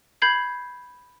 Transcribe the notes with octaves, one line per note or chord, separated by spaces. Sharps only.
B5 G6 G#6 C7